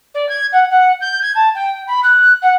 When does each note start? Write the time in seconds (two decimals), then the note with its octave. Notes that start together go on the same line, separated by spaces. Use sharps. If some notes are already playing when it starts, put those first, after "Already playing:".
0.14 D5
0.29 G#6
0.52 F#5
0.70 F#5
1.01 G6
1.22 G#6
1.35 A5
1.55 G5
1.87 B5
2.03 F#6
2.42 F#5